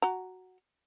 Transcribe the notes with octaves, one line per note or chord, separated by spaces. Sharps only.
F#4 A#5